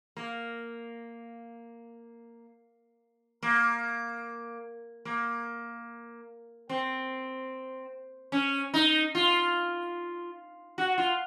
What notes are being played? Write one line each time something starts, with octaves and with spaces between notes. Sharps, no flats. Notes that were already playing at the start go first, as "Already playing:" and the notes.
A#3
A#3
A#3
C4
C#4
D#4
F4
F#4
F4